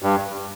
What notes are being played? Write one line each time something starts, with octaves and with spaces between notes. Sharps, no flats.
G2